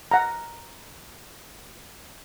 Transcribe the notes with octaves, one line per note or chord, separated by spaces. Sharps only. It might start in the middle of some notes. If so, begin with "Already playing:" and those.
F#5 A#5